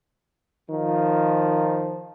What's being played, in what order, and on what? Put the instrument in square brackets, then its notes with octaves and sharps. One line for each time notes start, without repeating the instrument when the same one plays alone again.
[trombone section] D#3 F3